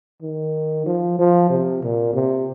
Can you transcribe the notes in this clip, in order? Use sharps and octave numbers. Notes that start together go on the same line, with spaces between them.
D#3
F3
F3
C3
A#2
C3